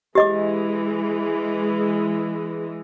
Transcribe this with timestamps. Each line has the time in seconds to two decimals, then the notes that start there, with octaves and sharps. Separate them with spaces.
0.15 E3 G#3 G4 D#5 D6